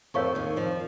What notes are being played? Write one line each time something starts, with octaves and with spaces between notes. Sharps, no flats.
F2 F3 A#4 C#5 F5 C#6
D#2 D#3
F2 F3